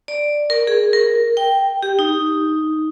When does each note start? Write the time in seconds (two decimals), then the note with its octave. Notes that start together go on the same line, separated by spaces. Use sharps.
0.08 D5
0.50 A#4
0.67 G#4
0.93 A#4
1.37 G5
1.83 G4
1.99 D#4